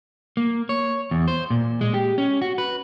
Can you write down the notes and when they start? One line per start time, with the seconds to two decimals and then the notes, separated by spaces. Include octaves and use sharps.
0.37 A#3
0.69 C#5
1.11 E2
1.28 C5
1.50 A#2
1.81 G#3
1.94 G4
2.18 C#4
2.42 F#4
2.58 B4